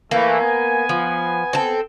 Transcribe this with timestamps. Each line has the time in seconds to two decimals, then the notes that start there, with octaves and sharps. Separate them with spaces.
0.11 E3 A3 A#3
0.40 B3 G#5
0.89 F3
1.53 C4 A4